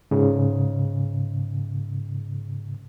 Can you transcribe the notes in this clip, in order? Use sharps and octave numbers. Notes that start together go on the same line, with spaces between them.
G#2 C#3